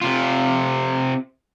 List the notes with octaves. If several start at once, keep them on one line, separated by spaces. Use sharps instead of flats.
C3 F4